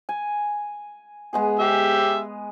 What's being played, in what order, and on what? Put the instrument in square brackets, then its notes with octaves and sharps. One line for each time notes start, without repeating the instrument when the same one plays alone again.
[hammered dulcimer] G#5
G#3 B3 G#4
[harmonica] G4 E5